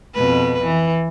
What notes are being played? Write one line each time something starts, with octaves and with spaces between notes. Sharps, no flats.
F2 B2 B4
E3